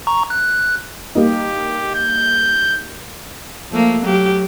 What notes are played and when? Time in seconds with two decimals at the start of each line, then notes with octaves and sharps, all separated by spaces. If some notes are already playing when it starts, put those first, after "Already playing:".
0.07 A#5 C#6
0.30 F#6
1.15 G3 A#3 D#4 G4
1.95 G6
3.71 F3 A3 A#3
4.02 F#3 G4